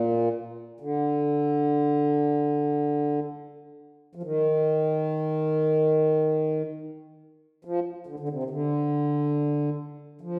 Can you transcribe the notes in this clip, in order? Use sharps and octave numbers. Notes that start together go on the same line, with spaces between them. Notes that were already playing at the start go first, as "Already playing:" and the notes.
Already playing: A#2
D3
F3
D#3
F3
D3
D3
C3
D#3
D3
F3